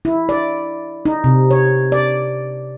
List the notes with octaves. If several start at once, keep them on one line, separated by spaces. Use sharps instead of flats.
E4
D5
D#4
C3
C#5
D5